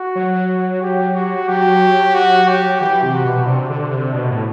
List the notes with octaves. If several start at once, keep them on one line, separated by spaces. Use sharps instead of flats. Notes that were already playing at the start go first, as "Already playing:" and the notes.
Already playing: F#4
F#3
G4
F#4
F#3 G4
F#4
G4
E3 G4
C3
F#4
B2
C3 D4
D3
C3
B2 D4
A2